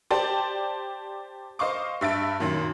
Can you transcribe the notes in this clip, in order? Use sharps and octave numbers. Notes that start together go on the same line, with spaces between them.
G4 C5 D5 A5
C5 D#5 F5 C#6 D6
G2 E5 A6 D7
F#2 A#2 D#3